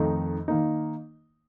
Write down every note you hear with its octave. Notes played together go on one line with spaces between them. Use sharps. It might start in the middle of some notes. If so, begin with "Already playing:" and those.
Already playing: F2 D#3 A3 D#4
D#3 A#3 D#4